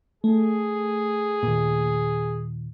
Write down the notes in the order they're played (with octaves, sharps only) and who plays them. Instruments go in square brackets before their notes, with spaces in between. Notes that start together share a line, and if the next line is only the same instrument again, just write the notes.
[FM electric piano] A3 [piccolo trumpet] G#4
[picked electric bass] D#2 A#2